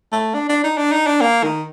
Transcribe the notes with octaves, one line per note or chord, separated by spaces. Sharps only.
A3
D4
D4
D#4
D4
D#4
D4
A#3
D#3